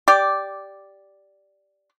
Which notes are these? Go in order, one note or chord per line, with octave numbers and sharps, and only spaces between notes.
G4 D5